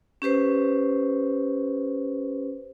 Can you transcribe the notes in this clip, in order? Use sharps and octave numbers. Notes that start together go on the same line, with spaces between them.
C#4 G4 B4 C5